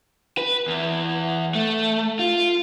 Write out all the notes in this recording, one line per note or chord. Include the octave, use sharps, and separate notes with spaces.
B4
E2
A3
F4